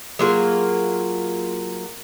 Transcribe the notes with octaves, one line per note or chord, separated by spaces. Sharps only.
F#3 A#3 F4 G#4